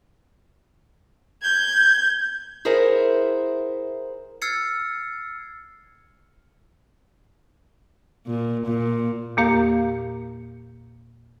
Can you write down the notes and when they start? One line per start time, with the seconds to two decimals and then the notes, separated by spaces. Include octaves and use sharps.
1.42 G6 G#6
2.65 E4 G#4 A#4 C5 E5 F#5
4.42 E6 F6 G#6 A6 C7 C#7
8.27 A#2
8.66 A#2
9.37 E2 A#2 A#3 G4 F5 G6